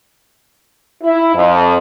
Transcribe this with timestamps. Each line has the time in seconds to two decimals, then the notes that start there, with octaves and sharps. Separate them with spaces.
1.03 E4
1.35 F2